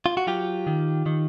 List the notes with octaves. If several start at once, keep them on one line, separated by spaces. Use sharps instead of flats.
F4
F#4
F#3 F4 G4
D#3
D#3